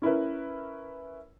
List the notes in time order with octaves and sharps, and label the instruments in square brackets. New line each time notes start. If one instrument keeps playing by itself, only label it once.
[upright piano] C#4 E4 A#4 B4